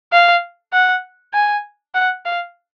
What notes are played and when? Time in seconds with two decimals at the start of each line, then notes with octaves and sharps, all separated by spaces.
0.13 F5
0.73 F#5
1.33 G#5
1.95 F#5
2.25 F5